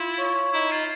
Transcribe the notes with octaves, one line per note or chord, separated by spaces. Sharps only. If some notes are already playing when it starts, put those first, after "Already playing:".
Already playing: E4 F4
C#5
D#4 E4
F4